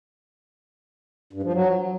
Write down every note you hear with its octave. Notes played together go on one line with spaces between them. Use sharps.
G2
F3
F#3